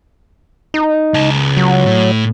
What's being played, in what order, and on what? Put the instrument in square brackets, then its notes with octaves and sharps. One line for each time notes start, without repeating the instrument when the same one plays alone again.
[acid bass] D#4
[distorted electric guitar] C#2 A5
[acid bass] F#3
[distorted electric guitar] A2